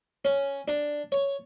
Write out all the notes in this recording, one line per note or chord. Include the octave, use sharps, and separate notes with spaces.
C#4
D4
C#5